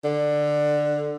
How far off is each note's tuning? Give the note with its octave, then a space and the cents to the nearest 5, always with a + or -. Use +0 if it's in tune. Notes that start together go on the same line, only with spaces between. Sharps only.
D3 +15